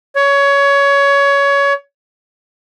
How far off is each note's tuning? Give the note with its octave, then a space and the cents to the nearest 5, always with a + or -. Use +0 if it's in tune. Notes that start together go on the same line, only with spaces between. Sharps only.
C#5 +20